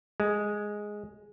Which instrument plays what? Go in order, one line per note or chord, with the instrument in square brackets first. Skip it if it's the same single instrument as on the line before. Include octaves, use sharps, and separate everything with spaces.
[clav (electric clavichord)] G#3